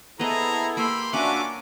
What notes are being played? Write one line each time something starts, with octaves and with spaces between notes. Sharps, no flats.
B3 E4 G#4 A4 C5 D#5 A#5
A#3 G4 B5 C6 E6
C#4 D4 F4 F#4 E5 F#5 G#5 D6